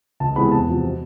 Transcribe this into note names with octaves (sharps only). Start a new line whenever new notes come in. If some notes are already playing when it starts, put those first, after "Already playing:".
C#2 A5
C3 E3 G#3 B3 B5
E2 A5
C3 F3
B2